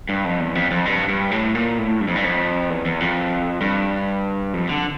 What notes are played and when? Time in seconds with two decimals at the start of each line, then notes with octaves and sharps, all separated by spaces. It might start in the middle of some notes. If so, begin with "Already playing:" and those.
0.09 G2
0.25 F2
0.40 E2
0.55 F2
0.71 F2
0.86 G2
1.09 G2
1.31 A2
1.55 A#2
1.78 A2
2.01 G2
2.08 F2
2.16 G2
2.24 F2
2.70 E2
2.86 E2
3.00 F2
3.61 G2
4.54 F2
4.69 D3